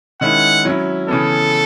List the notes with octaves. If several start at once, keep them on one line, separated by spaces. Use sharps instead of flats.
D#3 G#3 C#4 E4 F#5
F#3 C#4 E4
C#3 E3 B3 A4